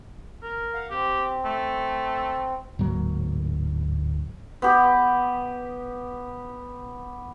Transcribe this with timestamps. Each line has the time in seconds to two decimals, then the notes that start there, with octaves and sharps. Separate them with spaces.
0.43 A#4
0.74 F5 F#5
0.91 C4 G4
1.45 A3
2.79 D1 G#2 F#3 A#3
4.62 B3 G4